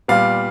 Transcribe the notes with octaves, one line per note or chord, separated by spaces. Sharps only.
A#2 G3 B3 F5